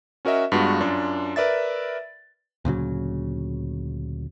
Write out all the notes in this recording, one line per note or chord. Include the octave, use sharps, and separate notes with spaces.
C#4 F#4 A#4 D#5 E5
G2 G#3 B3 F4 F#4
F#2 D4 F4
A#4 B4 D5 E5 A6
D2 A#2 C#3 F#3